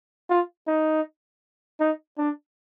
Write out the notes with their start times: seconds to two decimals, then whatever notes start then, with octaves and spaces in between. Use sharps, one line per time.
0.29 F4
0.67 D#4
1.80 D#4
2.18 D4